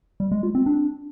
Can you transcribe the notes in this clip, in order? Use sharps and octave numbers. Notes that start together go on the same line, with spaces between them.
G3
G#3
F4
C4
D4